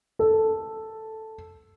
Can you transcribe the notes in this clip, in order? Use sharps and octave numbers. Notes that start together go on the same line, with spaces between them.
A4